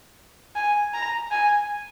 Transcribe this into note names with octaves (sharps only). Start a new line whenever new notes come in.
G#5
A#5
G#5